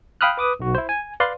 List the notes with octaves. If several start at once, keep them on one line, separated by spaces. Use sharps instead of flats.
F5 G5 B5 D#6 F6 F#6
B4 D6 D#6
B1 F#4
E4 C5
G#5
B4 D5 F5 C6